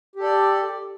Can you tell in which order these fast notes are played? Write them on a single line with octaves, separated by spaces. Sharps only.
G4 A4 D5